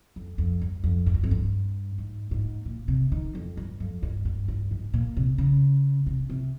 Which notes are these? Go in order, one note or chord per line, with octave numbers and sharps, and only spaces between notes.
F2
F2
G2
F2
G#2
G2
F2
G2
G#2
G#2
A#2
C3
D#3
F2
G2
F2
G2
G2
G2
G#2
A#2
C3
C#3
C3
C3